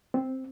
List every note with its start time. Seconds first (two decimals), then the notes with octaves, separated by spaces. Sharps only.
0.14 C4